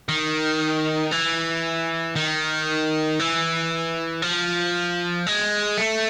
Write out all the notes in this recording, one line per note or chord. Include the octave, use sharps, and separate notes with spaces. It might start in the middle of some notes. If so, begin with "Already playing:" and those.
D#3
E3
D#3
E3
F3
G#3
A3